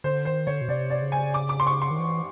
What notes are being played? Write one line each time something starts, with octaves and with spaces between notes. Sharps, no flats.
D3 C5
D#3 C5
D3 C#5
B2
C3 D5
D5
C#3
G#5
D6
D6
C6
C#6
C6
D#3
E3